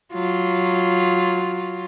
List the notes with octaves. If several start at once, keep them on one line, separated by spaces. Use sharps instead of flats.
F#3 F4